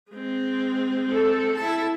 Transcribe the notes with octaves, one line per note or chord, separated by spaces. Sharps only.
G#3 C4
A4
E4 A5